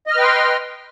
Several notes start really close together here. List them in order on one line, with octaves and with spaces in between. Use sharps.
D#5 F6 B4 G5 C6